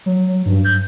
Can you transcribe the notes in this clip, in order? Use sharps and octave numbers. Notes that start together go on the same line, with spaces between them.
F#3
G2
G6